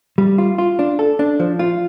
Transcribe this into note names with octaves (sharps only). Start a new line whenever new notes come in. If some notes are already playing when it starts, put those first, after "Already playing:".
G3
F4
F4
D4
A4
D4
F3
F4